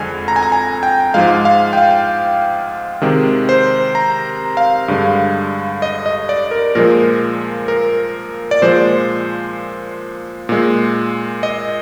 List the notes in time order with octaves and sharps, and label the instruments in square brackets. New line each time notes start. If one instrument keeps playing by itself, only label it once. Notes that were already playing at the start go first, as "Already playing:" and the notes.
Already playing: [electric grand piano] F2 D3 G#3 G#5
A#5
G#5
A#5
G#5
G5
G#2 F3 G#3 F5
F5
G5
F5
C3 D#3 G#3
C5
A#5
F5
G2 D3 G#3
D#5
D#5
D5
A#4
A#2 F3 G#3 A#4
A#4
D5
A#2 F3 G#3 C5
A#2 G#3
D#5